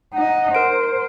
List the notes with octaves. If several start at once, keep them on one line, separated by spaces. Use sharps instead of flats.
D#4 D#5 F#5
A#4 C5 D7